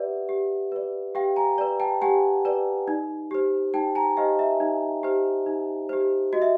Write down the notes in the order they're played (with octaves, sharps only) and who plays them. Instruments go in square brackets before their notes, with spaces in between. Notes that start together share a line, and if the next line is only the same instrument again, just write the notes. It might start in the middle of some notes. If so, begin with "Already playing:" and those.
Already playing: [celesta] G4 B4 D5 E5 F#5
G4
B4 D5
G4 F5 G5
G#5 A#5
B4 D5
G5 A5
G4 F#5 G#5
B4 D5
D#4
G4 C5
D#4 G5 A5
G#5 A#5
G4 C5 D#5 F5
E5
D#4
G4 C5
D#4
G4 C5
F#4 D#5
E5